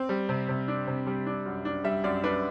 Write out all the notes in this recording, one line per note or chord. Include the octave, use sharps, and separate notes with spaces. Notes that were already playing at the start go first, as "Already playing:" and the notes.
Already playing: C4
G3
C3
C3
D4
C3
G3
D4
F#2
D4
G3 E5
F#2 D5
D4 B4